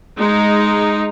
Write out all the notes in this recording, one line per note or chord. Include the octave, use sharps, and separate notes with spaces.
G#3 D#4